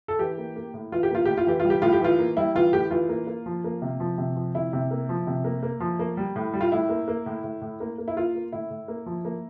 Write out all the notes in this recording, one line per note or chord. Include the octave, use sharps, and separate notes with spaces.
A4
E3 G4
A#3
A#3
A2
E3 F4
G4
A#3 F4
A2 G4
F4
E3 G4
F4
G3
G4
A2 F4
G4
E3 F4
A#3
G3 E4
E3 F4
A2 G4
E3 F4
A#3
A#3
F3
A#3
C3
F3
C3
F3
C3 E4
C3
A#3
F3
C3
A#3
A#3
F3
A#3
G3
A2
G3
F4
A2 E4
A#3
A#3
A2
A2
A2
A#3
A#3
E4
A#3 F4
A#3
A2 E4
A2
A#3
F3
A#3